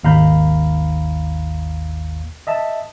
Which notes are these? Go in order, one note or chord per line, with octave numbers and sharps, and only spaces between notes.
G#1 D#2 F5 A#5 B5 G6
D#5 E5 A5